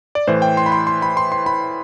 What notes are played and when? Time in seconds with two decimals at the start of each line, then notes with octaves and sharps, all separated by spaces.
0.15 D5
0.27 A2 E3 C5
0.42 G5
0.57 C6
0.66 B5
0.72 C6
0.87 C6
1.02 B5
1.17 C6
1.32 C6
1.46 B5